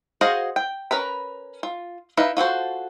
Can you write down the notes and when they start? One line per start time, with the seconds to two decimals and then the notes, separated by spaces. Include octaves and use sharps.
0.21 F#4 G#4 C5 D#5 F5
0.56 G5
0.91 C#4 A#4 B4 B5
1.63 F4
2.17 D#4 E4 B4 F5
2.37 F4 F#4 A4 C5